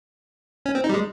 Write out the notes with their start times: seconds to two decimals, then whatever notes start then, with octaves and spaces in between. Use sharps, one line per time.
0.66 C#4
0.75 C4
0.84 D#4
0.89 G3
0.94 G#3